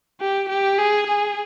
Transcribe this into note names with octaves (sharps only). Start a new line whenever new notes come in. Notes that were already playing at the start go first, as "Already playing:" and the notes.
G4
G4
G#4
G#4